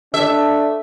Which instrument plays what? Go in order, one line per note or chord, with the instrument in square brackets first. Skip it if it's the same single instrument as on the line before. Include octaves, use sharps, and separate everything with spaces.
[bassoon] A3 [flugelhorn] D4 [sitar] E5